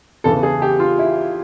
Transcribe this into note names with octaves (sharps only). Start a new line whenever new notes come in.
E2 C#3 E3 A4
G#4
G4
F4
E4